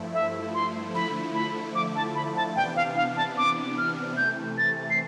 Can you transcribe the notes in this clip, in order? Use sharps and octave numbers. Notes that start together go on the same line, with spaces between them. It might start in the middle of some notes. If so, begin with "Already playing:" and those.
Already playing: G2 F3 A3 E4
E5
C6
D3 F3 A3 E4 B5
B5
D6
A5
B5
A5
C3 E3 B3 D4 G5
F5
F5
A5
D6
F6
C3 E3 A3 G6
A6
C7